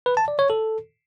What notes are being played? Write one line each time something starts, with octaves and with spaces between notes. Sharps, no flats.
B4
A5
D5
C#5
A4